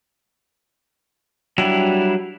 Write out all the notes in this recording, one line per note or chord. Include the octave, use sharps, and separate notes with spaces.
F#3 G3 D4 E4